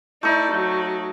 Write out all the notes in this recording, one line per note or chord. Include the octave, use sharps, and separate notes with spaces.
A3 D#4 E4 D5
F#3